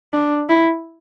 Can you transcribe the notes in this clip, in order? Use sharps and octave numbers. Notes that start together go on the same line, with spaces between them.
D4
E4